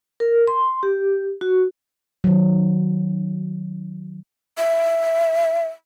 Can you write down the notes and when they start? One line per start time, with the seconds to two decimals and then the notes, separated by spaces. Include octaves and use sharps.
0.20 A#4
0.47 C6
0.83 G4
1.41 F#4
2.24 D#3 F#3
4.58 E5